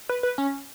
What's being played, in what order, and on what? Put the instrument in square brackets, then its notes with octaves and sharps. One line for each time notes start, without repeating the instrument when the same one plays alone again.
[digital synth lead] B4
B4
C#4